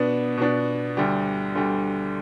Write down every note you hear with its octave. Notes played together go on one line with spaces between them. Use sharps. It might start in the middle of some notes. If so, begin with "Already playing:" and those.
Already playing: B2 B3 D4
B2 B3 D4
D2 D3 G3
D2 D3 G3